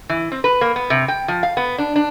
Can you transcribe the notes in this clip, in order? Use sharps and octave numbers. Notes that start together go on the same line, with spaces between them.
E3
C4
B4
A#3
B3
C3
G5
F3
F5
B3
D4
D4